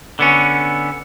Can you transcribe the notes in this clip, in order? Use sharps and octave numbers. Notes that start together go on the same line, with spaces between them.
D3 B3 C#4